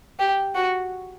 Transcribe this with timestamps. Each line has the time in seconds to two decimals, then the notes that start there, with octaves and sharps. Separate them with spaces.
0.19 G4
0.55 F#4